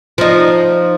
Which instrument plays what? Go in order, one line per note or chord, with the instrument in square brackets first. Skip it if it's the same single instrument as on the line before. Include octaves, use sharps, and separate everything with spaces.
[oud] F3 D#4